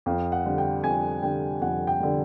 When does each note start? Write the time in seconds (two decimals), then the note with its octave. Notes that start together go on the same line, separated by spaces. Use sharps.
0.06 F2 F5
0.32 F#5
0.45 D3 G3
0.58 G5
0.84 F2 G#5
1.23 D3 G3 G5
1.61 F2 F#5
1.87 G5
2.00 D3 G3